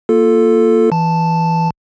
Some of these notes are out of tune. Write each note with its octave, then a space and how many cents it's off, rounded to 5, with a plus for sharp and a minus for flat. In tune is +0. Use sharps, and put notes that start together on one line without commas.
A#3 -5 F4 +0 A4 +0
E3 +0 A5 +0